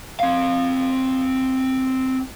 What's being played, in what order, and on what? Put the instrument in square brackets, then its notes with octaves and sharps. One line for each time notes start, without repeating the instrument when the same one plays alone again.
[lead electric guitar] C4 F5